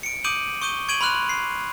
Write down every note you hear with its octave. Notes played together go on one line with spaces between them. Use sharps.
C#7 D7
D6 D#6 G6 D7 D#7 F#7
C#6 D#6 G6 D#7 G7
C#6 G#6 D7 D#7 F#7
B5 C6 F6 F#6 F7
C7